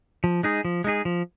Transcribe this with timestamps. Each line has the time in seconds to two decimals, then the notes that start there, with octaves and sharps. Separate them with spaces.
0.24 F3
0.43 G#3 D#4 G#4
0.65 F3
0.84 G#3 D#4 G#4
1.05 F3